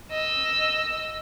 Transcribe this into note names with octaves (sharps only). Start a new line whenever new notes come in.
D#5 E6